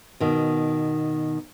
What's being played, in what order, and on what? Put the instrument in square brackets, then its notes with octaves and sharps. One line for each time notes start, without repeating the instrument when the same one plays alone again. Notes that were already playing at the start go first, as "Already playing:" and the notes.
[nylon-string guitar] B2 D#3